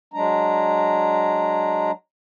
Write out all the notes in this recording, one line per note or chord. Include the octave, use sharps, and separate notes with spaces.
F#3 G#3 D4 A#5